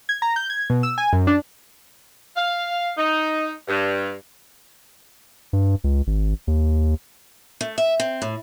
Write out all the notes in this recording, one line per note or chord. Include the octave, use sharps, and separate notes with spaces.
G#6
A#5
G6
G#6
B2
E6
G#5
F#2
D4
F5
D#4
G2
G2
C#2
G#1
D#2
A3
E5
C4
A2